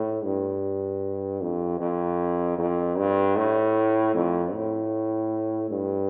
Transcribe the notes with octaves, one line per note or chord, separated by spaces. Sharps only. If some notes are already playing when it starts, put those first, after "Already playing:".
Already playing: A2
G2
F2
F2
F2
G2
A2
F2
A2
G2